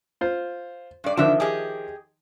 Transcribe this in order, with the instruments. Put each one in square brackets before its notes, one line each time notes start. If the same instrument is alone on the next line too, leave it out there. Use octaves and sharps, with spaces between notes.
[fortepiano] F4 C5
[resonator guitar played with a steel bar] G2 D5
[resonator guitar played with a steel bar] D3 D4 E5 [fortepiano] D#3 F3
[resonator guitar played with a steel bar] G4 G#4 D#5